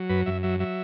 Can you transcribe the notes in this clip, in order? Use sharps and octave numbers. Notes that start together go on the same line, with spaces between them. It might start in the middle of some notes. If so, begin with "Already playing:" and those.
Already playing: F#3
F#2 B4
F#2 E5
F#3 E5
F#3 E5